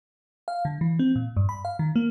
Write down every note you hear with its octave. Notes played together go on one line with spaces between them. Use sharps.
F5
D3
E3
C4
A#2
G2
B5
F5
D#3
A#3